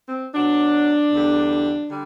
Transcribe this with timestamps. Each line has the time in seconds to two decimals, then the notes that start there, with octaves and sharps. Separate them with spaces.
0.09 C4
0.34 B2 F#3 D4
1.11 E2 D3 G3
1.89 D3 G3